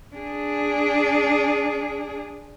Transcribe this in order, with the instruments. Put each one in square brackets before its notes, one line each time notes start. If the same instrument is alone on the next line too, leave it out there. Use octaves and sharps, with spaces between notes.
[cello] D4 G#4